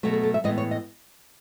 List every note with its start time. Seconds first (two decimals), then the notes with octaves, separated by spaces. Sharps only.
0.03 B2 F#3 A3 A4
0.13 G#4
0.23 A4
0.34 E5
0.44 A2 E3 G#3 B3 D#5
0.58 C#5
0.71 D#5